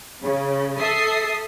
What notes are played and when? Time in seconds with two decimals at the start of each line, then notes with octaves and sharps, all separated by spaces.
0.22 C#3
0.79 A4 E5 D#6 C7